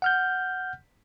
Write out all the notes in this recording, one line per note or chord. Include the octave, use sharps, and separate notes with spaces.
F#5 F6 G6